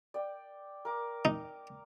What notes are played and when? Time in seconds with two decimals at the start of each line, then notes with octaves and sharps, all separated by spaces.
0.14 D5 G5
0.85 A#4 D6
1.25 D#4